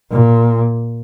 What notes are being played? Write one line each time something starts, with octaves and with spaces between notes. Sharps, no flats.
A#2